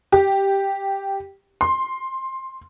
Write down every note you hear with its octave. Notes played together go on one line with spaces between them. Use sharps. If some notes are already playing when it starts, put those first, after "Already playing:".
G4
C6